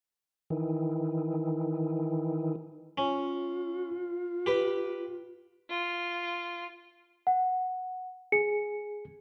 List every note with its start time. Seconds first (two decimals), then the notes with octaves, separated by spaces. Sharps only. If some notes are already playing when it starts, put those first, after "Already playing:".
0.50 D#3 E3
2.98 C#4 F4
4.46 G4 B4
5.71 F4
7.27 F#5
8.32 G#4 C#7